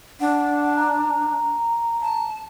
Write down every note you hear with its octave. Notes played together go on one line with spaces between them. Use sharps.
D4 F#5
A#5
A5